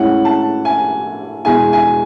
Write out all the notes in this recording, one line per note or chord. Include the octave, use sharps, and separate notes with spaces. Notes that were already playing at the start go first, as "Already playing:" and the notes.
Already playing: A2 G#3 C#4 E4 F#5
A5
G#5
E2 B2 G#3 G#5
G#5